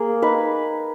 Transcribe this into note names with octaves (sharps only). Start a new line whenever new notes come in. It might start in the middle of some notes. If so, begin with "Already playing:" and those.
Already playing: A#3 G#4
D#4 B4